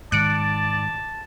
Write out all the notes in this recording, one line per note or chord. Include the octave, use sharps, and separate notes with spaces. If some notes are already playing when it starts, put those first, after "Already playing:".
G#2 D#3 G#3 D5 A5 F#6 C#7 D7